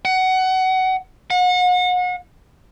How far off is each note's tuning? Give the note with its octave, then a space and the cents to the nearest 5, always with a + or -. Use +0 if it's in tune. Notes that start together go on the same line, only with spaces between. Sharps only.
F#5 +20
F#5 -35